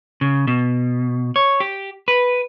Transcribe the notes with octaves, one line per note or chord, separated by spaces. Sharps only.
C#3
B2
C#5
G4
B4